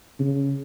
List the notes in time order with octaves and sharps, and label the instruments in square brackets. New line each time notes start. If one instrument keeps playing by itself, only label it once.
[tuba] C#3